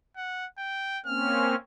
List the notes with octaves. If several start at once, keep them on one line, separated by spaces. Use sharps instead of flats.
F#5
G5
A#3 C4 C#4 F6